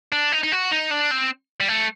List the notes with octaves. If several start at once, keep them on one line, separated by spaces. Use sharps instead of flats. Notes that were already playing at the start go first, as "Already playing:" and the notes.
D4
D#4
D#4
F#4
D#4
D4
C4
G3
A3